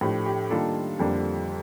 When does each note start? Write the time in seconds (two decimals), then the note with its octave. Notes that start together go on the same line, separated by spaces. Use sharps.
0.01 A2 F3 A3 D4 G4
0.26 G4
0.50 D#3 G3 A#3 D4 F4 A4
0.99 F2 D3 G3 A#3 D4